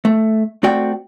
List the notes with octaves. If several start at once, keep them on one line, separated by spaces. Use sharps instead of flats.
A3
A3 C4 F#4 D5 G5